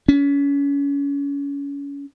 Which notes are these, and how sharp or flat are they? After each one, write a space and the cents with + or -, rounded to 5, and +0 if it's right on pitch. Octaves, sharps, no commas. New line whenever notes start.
C#4 +30